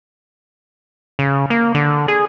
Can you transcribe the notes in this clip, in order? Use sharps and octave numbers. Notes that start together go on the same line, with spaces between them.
C#3
A#3
D3
G#4